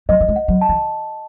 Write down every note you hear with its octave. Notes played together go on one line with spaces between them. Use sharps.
F#3 D#5
F#3
G#3
F#5
F#3
A5
E3